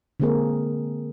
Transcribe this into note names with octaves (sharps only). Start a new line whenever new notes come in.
D3 G#3 A#3 C4 G#4 A#4